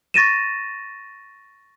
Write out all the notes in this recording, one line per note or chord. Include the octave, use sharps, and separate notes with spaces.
C#6 A6 A#6 D#7 E7